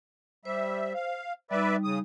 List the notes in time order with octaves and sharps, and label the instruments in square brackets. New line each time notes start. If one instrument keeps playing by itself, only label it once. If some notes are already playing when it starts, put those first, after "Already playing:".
[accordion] G3 E5 [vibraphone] C5
[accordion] F5
[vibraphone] G3 D#4 [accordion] B4 D5 E5
[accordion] C#3 D#6